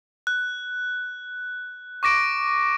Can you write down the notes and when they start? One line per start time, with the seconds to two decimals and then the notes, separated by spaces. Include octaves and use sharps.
0.27 F#6
2.03 C#6 D6 A#6 D7